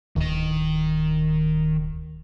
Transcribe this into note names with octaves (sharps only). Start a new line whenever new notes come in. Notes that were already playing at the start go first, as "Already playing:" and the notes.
D1 D#3 D#5